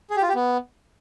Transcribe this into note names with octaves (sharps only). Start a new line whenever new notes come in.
G#4
G4
F4
G4
B3